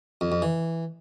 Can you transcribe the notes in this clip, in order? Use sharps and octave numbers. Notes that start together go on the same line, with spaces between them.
F2
F2
E3